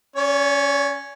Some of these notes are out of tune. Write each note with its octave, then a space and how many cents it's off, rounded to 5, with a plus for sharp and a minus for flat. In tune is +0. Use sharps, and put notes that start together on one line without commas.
C#4 +0 D5 -45